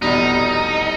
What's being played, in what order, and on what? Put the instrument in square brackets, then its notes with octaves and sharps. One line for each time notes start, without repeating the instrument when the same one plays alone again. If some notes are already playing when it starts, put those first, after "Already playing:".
[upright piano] F1 E2 B2 G3 [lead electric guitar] D#4